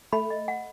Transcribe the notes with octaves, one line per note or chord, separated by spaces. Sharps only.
A3 B5
D#5
F#5